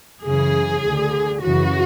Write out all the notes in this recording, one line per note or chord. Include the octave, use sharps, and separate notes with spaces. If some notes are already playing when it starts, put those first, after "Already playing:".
F#2 C#3 E3 G#4
D2 D3
F#2 C#3 E3 F#4